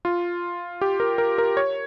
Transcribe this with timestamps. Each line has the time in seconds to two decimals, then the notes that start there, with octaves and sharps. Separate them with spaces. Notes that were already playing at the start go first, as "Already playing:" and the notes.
0.05 F4
0.81 G4
1.00 A#4
1.18 A#4
1.38 A#4
1.57 C#5